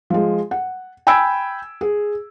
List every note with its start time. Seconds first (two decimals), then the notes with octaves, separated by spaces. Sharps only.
0.10 F3 G#3
0.51 F#5
1.07 G5 G#5 B5 E6 G#6 D7
1.81 G#4